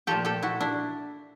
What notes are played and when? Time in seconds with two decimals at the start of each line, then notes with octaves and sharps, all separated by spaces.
0.07 A#2 F3 A3 G4 A4
0.25 G4 A4
0.43 E4 F#4
0.61 D4 E4